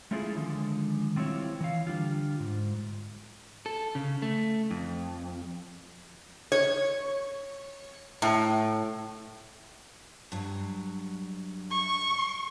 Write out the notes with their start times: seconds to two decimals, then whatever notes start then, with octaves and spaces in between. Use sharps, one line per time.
0.11 G#3 A3 C#4 E4 F4 G#4
0.35 D3 D#3 F3 G#3
1.16 G3 C4 E4 F4 C#5
1.61 E3 F5
1.87 D3 G3 D4 F4
2.40 G#2
3.66 A4
3.95 C#3
4.22 A3
4.71 F2
6.52 C#5
8.22 A2
10.32 G2 F#3
11.70 C#6